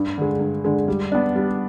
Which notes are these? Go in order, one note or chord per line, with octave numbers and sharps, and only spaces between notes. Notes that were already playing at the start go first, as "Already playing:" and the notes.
Already playing: G2
D3 G#3
G2
D3 G#3
G3
B3 D4
G3